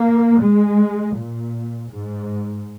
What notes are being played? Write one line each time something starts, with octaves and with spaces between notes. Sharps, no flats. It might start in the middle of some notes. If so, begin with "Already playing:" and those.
Already playing: A#3
G#3
A#2
G#2